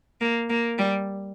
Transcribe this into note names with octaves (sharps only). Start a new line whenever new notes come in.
A#3
A#3
G3